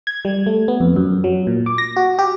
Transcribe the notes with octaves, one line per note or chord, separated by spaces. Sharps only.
G#6
G3
A3
B3
F2
F#2
F#3
A#2
D6
A#6
F#4
G4